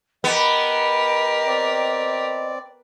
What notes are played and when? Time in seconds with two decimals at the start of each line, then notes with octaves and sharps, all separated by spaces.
0.24 B3 G4 A#4 D#5
1.47 C4 D5